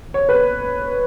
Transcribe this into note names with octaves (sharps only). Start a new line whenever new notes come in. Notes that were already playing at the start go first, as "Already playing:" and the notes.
C#5
B4